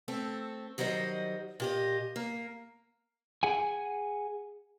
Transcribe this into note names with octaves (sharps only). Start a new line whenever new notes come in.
A3 C4 A4
D#3 F#3 G3 C5 D#5
A#2 G4 D#5
A#3
G#4 F#5 G#5